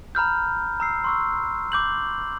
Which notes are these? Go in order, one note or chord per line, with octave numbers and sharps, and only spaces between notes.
A#5 B5 F6 G6
A#5 E6 C7
C6 C#6 E6
D6 G6 F#7